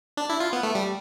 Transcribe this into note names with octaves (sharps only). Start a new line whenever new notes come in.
D4
E4
F4
B3
A3
G3